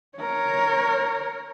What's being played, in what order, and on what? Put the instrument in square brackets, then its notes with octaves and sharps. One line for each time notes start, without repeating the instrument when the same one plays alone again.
[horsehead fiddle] A#4 C#5